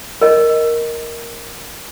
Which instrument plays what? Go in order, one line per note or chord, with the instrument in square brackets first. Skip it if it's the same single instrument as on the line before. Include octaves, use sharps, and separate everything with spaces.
[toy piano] A#4 D#5